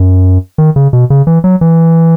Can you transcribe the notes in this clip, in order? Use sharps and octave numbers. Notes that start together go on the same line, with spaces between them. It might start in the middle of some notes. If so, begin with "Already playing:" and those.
Already playing: F#2
D#3
C#3
B2
C#3
E3
F#3
E3